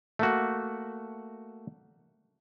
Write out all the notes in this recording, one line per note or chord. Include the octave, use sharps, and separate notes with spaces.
A3 A#3 F#4